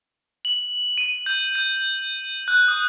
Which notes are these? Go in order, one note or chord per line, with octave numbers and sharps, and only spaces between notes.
F#7
D#7
G6
G6
F#6
D#6